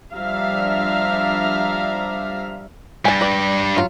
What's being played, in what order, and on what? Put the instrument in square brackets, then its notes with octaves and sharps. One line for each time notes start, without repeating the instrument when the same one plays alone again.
[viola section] F3 G3 D4 E5 F5 A#5
[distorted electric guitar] G2 G3 [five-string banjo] G#5 A5
[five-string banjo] B4 D5
F#3 F4